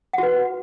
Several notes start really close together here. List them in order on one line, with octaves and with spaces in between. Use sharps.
F#5 F#4 B4